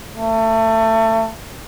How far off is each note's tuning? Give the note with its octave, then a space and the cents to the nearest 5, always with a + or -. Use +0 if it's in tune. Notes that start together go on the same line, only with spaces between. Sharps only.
A3 +25